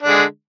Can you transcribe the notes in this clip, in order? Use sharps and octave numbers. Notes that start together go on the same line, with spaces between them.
D3 G#3 D4